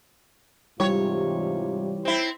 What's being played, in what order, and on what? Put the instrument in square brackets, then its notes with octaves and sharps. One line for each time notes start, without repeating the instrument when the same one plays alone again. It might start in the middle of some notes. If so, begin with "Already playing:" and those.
[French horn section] G#2 C3 F4 [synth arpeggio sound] E3 G3 G4 [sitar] C#5
[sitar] C4 E4